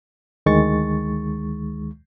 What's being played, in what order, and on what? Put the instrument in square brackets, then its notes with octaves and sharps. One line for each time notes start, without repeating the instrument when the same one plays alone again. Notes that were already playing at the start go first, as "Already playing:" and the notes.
[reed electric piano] D2 D#3 G#3 C#6 A6